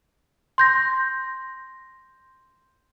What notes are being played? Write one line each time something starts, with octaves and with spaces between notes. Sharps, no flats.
C6 G6 A#6